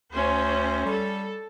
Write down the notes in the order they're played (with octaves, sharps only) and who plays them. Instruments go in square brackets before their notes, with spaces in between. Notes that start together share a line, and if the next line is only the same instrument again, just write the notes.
[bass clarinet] D2 [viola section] C#4 C5
[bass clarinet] G3 [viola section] A4